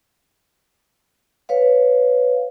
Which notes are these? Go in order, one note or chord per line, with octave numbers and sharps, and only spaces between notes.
B4 C#5 F5